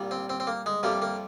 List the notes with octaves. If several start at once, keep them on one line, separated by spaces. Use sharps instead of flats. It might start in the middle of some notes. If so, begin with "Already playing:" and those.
Already playing: C2 A#2 G3
C4
C4
C4
A#3
G#3
F2 C3 G3 A#3
A#3